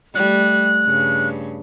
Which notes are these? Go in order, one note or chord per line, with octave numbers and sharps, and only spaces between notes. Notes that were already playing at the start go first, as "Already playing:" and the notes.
G3 A3 F#6
G2 C#3